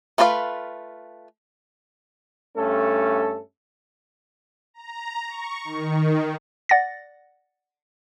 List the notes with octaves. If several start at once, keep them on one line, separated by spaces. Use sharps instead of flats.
A3 F4 B4 D5 F5
G2 A3 C#4 A4
A#5
C#6
D#3
D5 F#5 A6 A#6